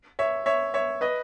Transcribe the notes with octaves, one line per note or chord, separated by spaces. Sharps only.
C#5 E5
C#5 E5
C#5 E5
B4 D#5